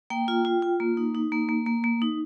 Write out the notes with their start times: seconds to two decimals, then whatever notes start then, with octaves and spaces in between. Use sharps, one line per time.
0.10 A#3 G5
0.28 F4
0.45 F4
0.62 F4
0.80 A#3
0.97 D#4
1.15 D#4
1.32 A#3
1.49 A#3
1.66 A#3
1.84 A#3
2.02 D#4